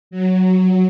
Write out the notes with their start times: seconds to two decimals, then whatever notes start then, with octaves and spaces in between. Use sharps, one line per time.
0.11 F#3